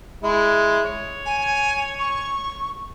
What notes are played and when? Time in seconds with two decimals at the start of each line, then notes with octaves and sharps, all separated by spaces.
0.23 G#3 E4
0.85 C#5
1.26 G#5
2.00 C#6